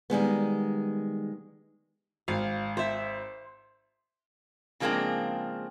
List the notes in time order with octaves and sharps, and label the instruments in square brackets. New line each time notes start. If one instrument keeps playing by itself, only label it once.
[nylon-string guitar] D#3 G3 G#3 B3
[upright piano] G#1 [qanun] F5
[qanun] C5 E5
[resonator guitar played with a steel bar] C#3 F3 G#3 A#3 C4 D4